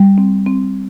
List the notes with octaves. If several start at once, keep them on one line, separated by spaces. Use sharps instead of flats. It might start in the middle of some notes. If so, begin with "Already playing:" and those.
Already playing: G3
C4
C4